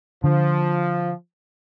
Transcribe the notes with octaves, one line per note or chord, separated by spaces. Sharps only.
D3 F3